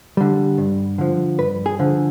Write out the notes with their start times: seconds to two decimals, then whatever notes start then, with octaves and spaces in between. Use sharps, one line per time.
0.17 D3 G3
0.58 G2
0.98 D3 F3
1.39 G2 B4
1.66 G#4
1.79 D3 F3